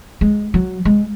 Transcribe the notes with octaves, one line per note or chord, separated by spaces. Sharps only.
G#3
F#3
G#3